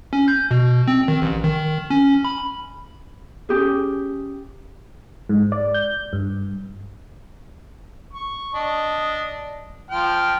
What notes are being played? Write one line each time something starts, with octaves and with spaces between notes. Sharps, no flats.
C#4
G6
B2
C4
D#3
A1
D#3
C#4
B5
C#4 G4 G#4
G#2
D5
G6
G2
C#6
D4 D#5
F3 G5 F6